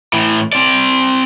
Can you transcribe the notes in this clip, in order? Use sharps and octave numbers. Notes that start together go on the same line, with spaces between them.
A2 E3
C4 D5